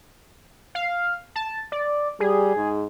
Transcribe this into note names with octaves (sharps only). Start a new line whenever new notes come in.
F5
A5
D5
G3 G#4
G#2